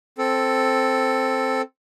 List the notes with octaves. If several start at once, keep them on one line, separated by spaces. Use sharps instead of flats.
C4 A4